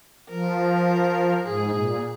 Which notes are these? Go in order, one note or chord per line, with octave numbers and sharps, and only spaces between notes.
F3 A#4
G#2 G#4
A#2